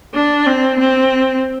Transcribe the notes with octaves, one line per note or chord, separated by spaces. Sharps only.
D4
C4
C4